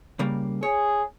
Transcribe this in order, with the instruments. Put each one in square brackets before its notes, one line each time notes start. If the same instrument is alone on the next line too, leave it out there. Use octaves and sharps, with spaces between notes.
[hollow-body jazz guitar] C#3 G3 A#3
[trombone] G#4 [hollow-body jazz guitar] C#5